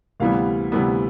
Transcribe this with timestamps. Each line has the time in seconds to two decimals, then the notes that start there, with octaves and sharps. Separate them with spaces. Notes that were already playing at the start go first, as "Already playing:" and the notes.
0.20 D2 C3 E3 G3 B3 F5
0.72 D2 C3 E3 G3 B3